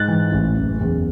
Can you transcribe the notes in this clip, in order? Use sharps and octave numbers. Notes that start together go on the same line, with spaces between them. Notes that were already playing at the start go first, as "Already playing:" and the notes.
Already playing: G#2 F#6 A6
E3
A1
F#1
E2